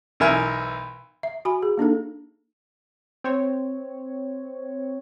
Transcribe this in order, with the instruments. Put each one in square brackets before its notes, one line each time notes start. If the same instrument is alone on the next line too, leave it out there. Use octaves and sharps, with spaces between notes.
[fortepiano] B1 E3 A#4 E5 G#5
[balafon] E5
F#4 G#5 B5
G#4
A#3 D4 D#4 A4
[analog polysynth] C4 C#5